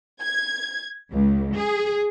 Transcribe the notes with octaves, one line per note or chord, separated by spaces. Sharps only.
G#6
C#2
G#4